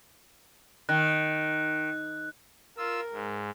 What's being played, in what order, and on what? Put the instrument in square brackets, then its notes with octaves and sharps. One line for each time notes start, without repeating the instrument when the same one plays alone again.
[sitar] D#3 [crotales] F#6
[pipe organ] F4 E6 [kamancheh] A#4
[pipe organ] G#2